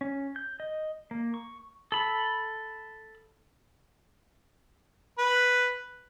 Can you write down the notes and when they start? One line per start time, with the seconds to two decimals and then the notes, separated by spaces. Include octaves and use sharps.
0.01 C#4
0.36 G6
0.60 D#5
1.11 A#3
1.34 C#6
1.92 A4 B5
5.19 B4